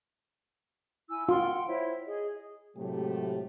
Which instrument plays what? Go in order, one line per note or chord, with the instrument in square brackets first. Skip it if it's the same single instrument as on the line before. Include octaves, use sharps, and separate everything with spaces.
[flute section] E4 G#5 E6
[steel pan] F4 [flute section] F#5 G5 C6
[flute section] E4 C5 C#5
G#4 D#5
[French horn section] A2 C3 F#3 G#3 A3 G4